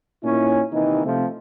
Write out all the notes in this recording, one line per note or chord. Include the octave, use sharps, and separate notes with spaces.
A#2 C#4 D#4 E4
D#2 C3 D#3 E3 A#3 D#4
C3 F3 A3 C4